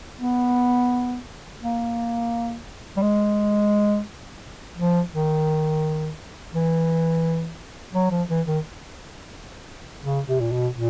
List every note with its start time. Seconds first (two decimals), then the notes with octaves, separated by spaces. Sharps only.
0.21 B3
1.61 A#3
2.97 G3
3.02 G#3
4.77 F3
5.12 D#3
6.53 E3
7.94 F#3
8.11 F3
8.29 E3
8.47 D#3
10.04 C#3
10.28 C3
10.40 A#2
10.52 B2
10.74 A#2